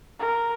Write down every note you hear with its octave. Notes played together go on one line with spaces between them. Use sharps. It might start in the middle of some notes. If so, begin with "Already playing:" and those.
A#4